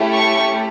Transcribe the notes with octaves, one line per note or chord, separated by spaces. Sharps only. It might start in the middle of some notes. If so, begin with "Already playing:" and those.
Already playing: A3 C#4 E4 G4
C#6